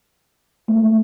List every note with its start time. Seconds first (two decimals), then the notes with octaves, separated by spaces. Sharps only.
0.68 A3